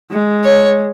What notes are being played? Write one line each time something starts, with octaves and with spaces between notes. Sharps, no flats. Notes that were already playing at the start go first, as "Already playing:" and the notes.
G#3
C#5